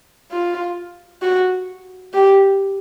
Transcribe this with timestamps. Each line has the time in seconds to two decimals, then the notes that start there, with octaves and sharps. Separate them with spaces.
0.31 F4
1.22 F#4
2.14 G4